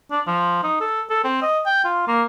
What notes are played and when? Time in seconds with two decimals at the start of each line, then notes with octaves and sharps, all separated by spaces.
0.11 D4
0.27 F3
0.63 D#4
0.81 A4
1.10 A4
1.24 C4
1.42 D#5
1.66 G5
1.85 F4
2.08 A#3